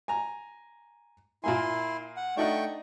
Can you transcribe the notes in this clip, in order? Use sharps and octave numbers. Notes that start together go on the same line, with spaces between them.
G#5 A#5
A#2 A#3 E4 G#5 C6
F#5
A3 D4 D#4 F#5 G5 C#6